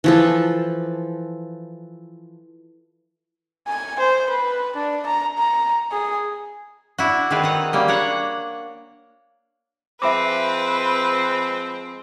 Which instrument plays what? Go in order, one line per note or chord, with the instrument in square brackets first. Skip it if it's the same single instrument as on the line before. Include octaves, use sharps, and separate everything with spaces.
[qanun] E3 F3 A4
[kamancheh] G#5
C5
B4
D4
A#5
A#5
G#4
[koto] D4 E4 F#4
D#3 C4 G#4 A4 B4
D#4 F#5
G3 A#3 C#4
D4 C#5 F#5 A#5
[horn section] F3 G#3 C4 [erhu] B4 [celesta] E5 B5 D6